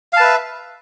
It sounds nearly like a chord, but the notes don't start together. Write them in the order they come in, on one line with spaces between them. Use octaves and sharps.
F5 A5 B4 E5